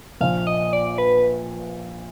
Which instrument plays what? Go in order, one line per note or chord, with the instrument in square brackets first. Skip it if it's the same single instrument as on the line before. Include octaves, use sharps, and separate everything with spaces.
[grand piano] A#1 A#2 F3 [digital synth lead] F5
[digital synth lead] D#5
D5
B4